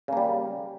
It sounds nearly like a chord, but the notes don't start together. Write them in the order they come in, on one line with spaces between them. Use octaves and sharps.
C#3 A#3 G3